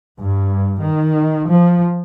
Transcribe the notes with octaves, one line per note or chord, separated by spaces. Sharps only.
G2
D#3
F3